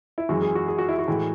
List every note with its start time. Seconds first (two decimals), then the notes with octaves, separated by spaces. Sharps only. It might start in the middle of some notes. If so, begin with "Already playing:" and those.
0.18 E4
0.29 F#2 E3 G#3 F#4
0.42 G#4
0.55 F#4
0.68 G#4
0.78 F#4
0.89 E4
0.99 F#4
1.08 A2 E3 G#3